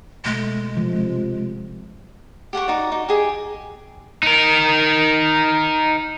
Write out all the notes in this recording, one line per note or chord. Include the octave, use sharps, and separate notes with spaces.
B2 G#3 A3
C3 F3
G4 F#5 G#5 C#6
D#4 F#4 D5
D#4
G4 G#4 D#5
D#4 A#4